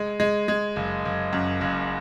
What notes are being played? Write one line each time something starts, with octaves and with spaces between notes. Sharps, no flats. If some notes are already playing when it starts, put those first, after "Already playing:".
Already playing: G#3
G#3
G#3
F#1
F#1
F#2
F#1